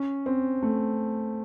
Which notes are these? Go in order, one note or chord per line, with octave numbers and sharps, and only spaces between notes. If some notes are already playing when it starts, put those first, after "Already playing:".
Already playing: C#4
C4
A3